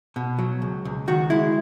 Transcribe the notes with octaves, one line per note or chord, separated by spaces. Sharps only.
B2
F#3
C#2
C#2
D#3 F#4
G#3 E4